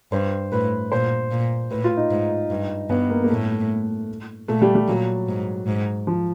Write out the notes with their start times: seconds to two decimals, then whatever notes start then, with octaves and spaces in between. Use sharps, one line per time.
0.12 G2 C5
0.52 A2 B4
0.92 A#2 C5
1.31 A#2
1.71 A2 B4
1.84 F4
1.97 D#4
2.11 G#2
2.50 G2
2.90 G2 B3
3.10 A#3
3.24 A#3
3.30 A2 A3
4.48 A#2 A3
4.62 G3
4.75 G3
4.88 A#2 F#3
5.28 G#2
5.67 G#2
6.07 F3